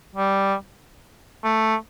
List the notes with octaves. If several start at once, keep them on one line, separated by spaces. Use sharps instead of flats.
G3
A3